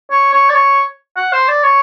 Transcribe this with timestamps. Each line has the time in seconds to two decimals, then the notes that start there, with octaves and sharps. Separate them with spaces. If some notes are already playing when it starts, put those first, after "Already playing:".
0.11 C#5
0.33 C#5
0.49 D5
0.54 C#5
1.17 F#5
1.32 C5
1.48 D5
1.64 C#5